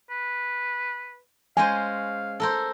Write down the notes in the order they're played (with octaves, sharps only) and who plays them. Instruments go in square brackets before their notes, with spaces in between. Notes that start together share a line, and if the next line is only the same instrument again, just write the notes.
[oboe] B4
[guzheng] G#3 C#4 C5 [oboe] F5 [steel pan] G#5
[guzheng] A4 A#4 C5